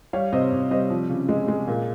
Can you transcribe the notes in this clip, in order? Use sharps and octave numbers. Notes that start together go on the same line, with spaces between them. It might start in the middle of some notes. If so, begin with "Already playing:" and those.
G3 C#5 F5
C3 C5 D#5
C3
G3 C5 D#5
F3
C#3
G#3
G#3
A#2